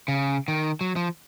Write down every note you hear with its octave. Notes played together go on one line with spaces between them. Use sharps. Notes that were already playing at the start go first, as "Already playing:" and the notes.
C#3
D#3
F#3
F3